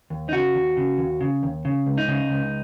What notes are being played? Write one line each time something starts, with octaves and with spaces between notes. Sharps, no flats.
D#2
D#4
C#3 F#4
D#2
C#3
D#2
C#3
D#2
C#3
C#2
D#4
C#3
C#2